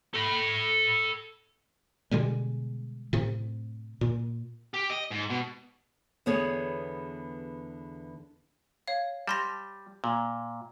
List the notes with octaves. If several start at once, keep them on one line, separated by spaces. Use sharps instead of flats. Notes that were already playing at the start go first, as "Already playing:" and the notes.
A4 B5
B2 D3 G3 G#3
A2 C3
A#2
G4
D#5
G#2
B2
E2 D3 B3 G#4 C#5
C#5 F5
G3 A5 C6 A#6
A#2